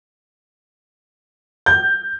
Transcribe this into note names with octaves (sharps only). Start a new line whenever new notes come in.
G6